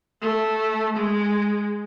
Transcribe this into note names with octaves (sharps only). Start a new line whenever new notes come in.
A3
G#3